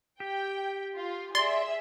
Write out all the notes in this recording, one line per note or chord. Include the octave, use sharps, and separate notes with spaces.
G4 G5
F4
G#4 D5 E5 C6